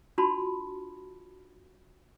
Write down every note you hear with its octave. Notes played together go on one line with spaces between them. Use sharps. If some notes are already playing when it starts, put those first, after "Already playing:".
D4 F4 F#4 A5 B5 C6